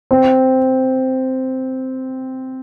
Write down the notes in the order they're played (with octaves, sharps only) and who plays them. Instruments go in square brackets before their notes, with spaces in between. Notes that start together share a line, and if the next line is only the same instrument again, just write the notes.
[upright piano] C4